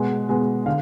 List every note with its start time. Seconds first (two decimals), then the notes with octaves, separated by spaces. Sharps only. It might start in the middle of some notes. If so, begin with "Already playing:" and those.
Already playing: B2 G#3 F#5
0.29 B2 G#3
0.66 D3 F5